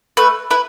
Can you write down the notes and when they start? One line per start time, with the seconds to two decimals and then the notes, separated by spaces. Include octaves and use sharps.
0.17 A3 B4
0.50 E4 B4